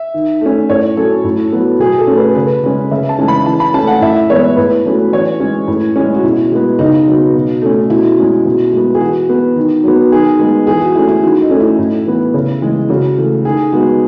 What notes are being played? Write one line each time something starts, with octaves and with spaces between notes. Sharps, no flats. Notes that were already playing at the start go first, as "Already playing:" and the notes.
Already playing: E5
D#3
A3 C#4
A2 C#5
F#3 C#4 A4
A2
F#3 B3
B2 G#4
A4
A3 C#4
B4
C#3 B4
G#3 C#4
C#3 E5
A5
E3 G#3 C#4
B5
E3 A5
B5
A3 C#4 A5
F#5
A2 E5
E3 G#3 B3 C#5
A2 B4
F#3 A3 C#4
E3 C#5
G#3 C#4
A2
G#3 C#4
F#4
B2 E4
G#3 B3
C#3 D#4
F#3 B3
B2
A3 C#4
B2 E4
G#3 C#4
B2
G#3 B3
G#4
E3 F#4
B3
D#3
F#3 B3
D#3 G#4
G#3 B3
E3 G#4
F#4
A3 C#4 E4
E4
D#3 F#4
D#4
A3 C#4
E4
A2
E3 B3
C#3
E3 G#3
C#3 F#4
E3 A3
D#3 G#4
G#3 B3 F#4